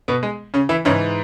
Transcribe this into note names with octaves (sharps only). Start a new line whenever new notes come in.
B2 B3
G#3
C#3 C#4
E3 E4
G#2 C#3 E3 C#4